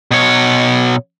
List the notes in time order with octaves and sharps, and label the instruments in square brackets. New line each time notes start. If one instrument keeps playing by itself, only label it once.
[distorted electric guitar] B2 C#5